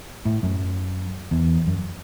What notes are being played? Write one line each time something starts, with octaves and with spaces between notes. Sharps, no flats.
A2
F#2
E2
F#2